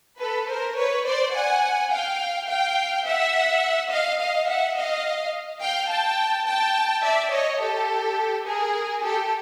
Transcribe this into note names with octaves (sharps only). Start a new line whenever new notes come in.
A4 B4
A#4 C5
B4 C#5
C5 D5
F#5 G#5
F5 G5
F5 G5
E5 F#5
D#5 F5
D#5 F5
E5 F#5
D#5 F5
F5 G5
G5 A5
G5 A5
D5 E5
C#5 D#5
G4 A4
G#4 A#4
G4 A4